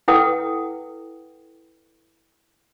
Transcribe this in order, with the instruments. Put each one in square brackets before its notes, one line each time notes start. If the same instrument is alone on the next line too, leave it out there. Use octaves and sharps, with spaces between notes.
[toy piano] E4 A4 B4 F#5 G5 D#6